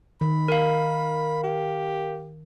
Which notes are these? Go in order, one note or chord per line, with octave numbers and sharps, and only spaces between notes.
D#3 B5
A#4 F5
G4